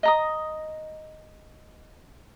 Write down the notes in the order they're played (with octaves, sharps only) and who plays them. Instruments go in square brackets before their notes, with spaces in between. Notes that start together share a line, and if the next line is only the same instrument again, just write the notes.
[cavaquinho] D#5 A#5 D#6